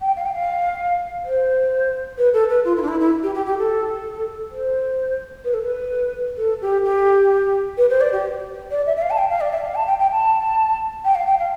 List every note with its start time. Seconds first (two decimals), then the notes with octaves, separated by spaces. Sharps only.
0.01 G5
0.16 F5
0.26 G5
0.34 F5
1.25 C5
2.18 B4
2.34 A4
2.49 B4
2.65 F4
2.77 E4
2.82 D4
2.88 E4
3.00 E4
3.23 G4
3.35 G4
3.46 G4
3.58 A4
4.51 C5
5.45 B4
5.54 A4
5.63 B4
6.38 A4
6.62 G4
6.84 G4
7.78 B4
7.90 C5
8.01 D5
8.12 G4
8.71 D5
8.87 E5
8.97 E5
9.02 F5
9.11 A5
9.18 G5
9.30 F5
9.41 D5
9.52 E5
9.64 F5
9.75 A5
9.87 G5
9.99 G5
10.11 A5
11.05 G5
11.15 F5
11.27 G5
11.39 F5